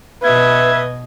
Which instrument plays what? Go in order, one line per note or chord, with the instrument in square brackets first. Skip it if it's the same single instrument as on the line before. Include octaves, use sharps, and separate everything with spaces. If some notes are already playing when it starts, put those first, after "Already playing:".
[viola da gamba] B2 D#5 [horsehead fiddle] B4 [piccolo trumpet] E5 [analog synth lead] G#6